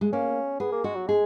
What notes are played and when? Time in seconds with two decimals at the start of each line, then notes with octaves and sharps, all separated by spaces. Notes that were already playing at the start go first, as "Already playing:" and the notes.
0.01 G#3
0.13 A#3 C#4
0.60 B3 G#4
0.72 A#3
0.84 G#3 F#4
0.96 F#3
1.08 G#3 G#4